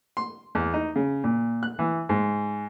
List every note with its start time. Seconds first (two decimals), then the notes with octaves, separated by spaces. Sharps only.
0.17 C6
0.55 E2
0.74 D#4
0.96 C#3
1.24 A#2
1.63 F#6
1.79 E3
2.09 G#2